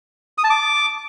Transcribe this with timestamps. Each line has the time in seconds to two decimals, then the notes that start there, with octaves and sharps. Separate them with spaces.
0.38 D#6
0.44 A5
0.50 D6